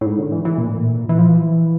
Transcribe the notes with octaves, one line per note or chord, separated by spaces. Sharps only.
A2
G#2
D3
E3
E3
A#2
A2
A#2
E3
F3
E3